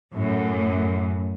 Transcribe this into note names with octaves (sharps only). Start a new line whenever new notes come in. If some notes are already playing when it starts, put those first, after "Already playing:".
F#2 A2